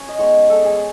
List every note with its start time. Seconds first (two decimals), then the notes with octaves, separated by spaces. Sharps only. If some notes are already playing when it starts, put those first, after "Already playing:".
Already playing: C#4 G#5
0.08 D#5
0.19 G#3 B3 D#4 C#5
0.49 G#3 B3 D#4 A4
0.65 G#4